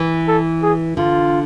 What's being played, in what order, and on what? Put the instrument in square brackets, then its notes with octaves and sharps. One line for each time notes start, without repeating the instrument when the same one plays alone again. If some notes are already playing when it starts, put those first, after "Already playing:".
Already playing: [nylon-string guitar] E3
[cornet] A4
G#4
[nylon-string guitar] D3 [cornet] F4